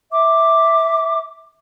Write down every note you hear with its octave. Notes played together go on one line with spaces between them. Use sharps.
E5 D6